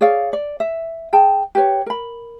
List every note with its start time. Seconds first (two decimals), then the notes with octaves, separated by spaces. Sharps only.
0.01 G#4 C#5 D5 F5
0.33 D5
0.60 E5
1.13 G#4 G5 A5
1.55 G4 B4 C#5
1.86 A#4 B5